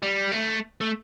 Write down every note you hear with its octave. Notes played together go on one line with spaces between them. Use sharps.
G3
A3
A3